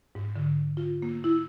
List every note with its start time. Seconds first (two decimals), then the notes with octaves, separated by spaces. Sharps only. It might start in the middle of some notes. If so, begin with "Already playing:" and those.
0.15 G#2
0.36 D3
0.77 F4
1.02 A#3
1.24 E4